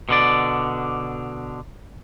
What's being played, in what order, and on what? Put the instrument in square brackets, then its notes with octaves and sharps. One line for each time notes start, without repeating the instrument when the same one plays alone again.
[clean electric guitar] B2 D3 D5